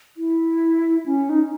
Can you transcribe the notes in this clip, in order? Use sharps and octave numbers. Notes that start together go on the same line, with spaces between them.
E4
C#4
D#4